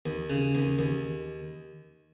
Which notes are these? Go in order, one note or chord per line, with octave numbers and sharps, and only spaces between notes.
D#2
C#3
D#2
D#2